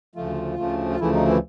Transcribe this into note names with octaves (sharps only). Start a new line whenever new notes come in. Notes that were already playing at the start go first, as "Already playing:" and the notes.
D2 C#3 F3 A3 F4
D2 C#3 F3 A3
F4
D2 C#3 E3 F3 A3 E4
D#4
E3 E4